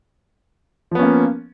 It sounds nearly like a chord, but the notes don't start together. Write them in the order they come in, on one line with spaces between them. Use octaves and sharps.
F3 B3 C#4 A#3